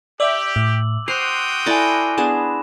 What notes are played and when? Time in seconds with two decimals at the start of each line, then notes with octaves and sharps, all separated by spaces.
0.20 G4 D5 E5 D6 E6 F#7
0.56 A2
1.08 F#4 C5 G5 C6 D#6 F#6 C7 F7
1.66 E4 A4 D5 G#5 B5 A#6
2.18 B3 D4 G#4 E7